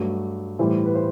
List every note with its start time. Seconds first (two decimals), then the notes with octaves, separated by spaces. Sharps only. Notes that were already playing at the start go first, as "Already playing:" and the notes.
Already playing: G2 F#3 A3
0.59 A2 E3 G3 C5
0.86 B4
0.95 C5